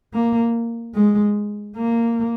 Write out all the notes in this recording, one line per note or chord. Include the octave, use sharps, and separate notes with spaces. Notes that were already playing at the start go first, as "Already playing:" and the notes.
A#3
G#3
A#3